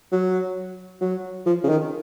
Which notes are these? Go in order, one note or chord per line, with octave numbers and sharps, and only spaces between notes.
F#3
F#3
F3
C#3
D#3